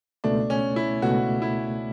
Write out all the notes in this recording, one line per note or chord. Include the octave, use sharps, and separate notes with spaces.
C#2 B2 A3 D4
C#4
E4
C#2 B2 A3 F#4
E4